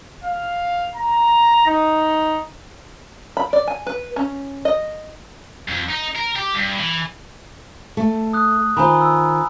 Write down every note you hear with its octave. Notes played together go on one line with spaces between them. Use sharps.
F5
A#5
D#4
B5
D5
G#5
B4
C#4
D#5
F2
D#4
A#4
G4
G2
E3
A3
D#6 F#6
D#3 F4 C5 G#5 A#5 B5
E6